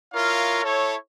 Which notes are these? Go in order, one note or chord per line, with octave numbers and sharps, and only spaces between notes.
E4 F4 A#4 C#5 F5
E4 A4 C#5